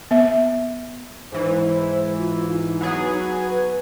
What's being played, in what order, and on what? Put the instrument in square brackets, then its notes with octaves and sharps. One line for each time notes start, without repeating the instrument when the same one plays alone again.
[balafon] B3 E5
[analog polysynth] G#2 E3 [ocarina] C5
[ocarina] F4
D#4
[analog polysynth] F#3 B3 G#4
[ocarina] B4